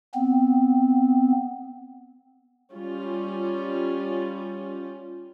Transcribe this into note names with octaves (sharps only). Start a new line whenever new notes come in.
B3 C4
G3 C#4 F4